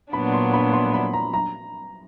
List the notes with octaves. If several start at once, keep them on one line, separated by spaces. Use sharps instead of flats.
A#2 F#3 B3 D4 B5
C6
B5
C6
B5
A#5
A#5